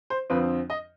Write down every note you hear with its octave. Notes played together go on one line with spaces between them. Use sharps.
C5
F2 D3 F3 C4 F4 B4
D#5